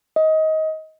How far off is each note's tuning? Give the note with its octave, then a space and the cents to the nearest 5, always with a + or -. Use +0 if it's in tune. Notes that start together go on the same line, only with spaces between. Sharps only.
D#5 +20